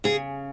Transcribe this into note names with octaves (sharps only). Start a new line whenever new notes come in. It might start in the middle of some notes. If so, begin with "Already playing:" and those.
C#3 G#4